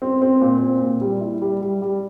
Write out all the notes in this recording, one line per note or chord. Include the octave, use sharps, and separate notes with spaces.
C4
C4
A#2
C4
A#2
G3
E4
G3
G3
G3